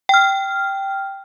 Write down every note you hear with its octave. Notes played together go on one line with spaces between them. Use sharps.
G5 F6